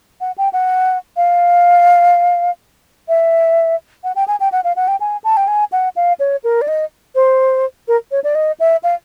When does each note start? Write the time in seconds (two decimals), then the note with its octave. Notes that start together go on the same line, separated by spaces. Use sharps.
0.21 F#5
0.38 G5
0.53 F#5
1.17 F5
3.08 E5
4.04 F#5
4.16 G5
4.28 G#5
4.40 G5
4.52 F#5
4.64 F5
4.76 F#5
4.88 G5
5.00 G#5
5.24 A5
5.37 G5
5.48 G#5
5.72 F#5
5.96 F5
6.20 C#5
6.44 A#4
6.61 D5
6.68 D#5
7.15 C5
7.88 A#4
8.11 C#5
8.24 D5
8.35 D#5
8.60 E5
8.83 F5